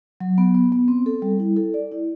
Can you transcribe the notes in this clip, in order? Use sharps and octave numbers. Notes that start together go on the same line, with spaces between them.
F#3
B3
B3
B3
C4
A4
G3
E4
A4
D5
E4